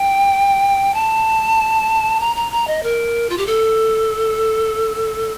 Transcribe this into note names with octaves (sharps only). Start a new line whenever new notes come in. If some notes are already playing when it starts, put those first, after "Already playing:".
Already playing: G5
A5
A#5
A#5
A#5
D#5
A#4
F4
G4
A4